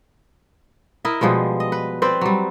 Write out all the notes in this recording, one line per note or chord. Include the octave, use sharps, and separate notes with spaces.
E4 A#4 D#5 E5
B2 F3 G3 G#3
D#5
B4
C4 B4 C5 D5
F#3 G3